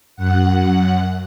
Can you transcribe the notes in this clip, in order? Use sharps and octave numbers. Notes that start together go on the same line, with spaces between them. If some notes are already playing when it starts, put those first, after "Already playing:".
F#2 F#5